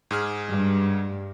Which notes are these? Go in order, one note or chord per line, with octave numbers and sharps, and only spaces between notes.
G#2 G#4 F6
G2